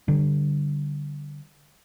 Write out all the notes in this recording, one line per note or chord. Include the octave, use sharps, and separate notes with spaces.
D3 G3